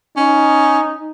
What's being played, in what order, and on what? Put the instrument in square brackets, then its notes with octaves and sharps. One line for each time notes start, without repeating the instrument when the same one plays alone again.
[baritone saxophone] C#4 [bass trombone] D#4